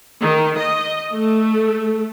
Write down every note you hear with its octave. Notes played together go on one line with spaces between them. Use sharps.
D#3
D#5
A3